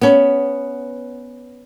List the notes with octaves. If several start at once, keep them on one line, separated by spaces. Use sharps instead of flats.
B3 C#4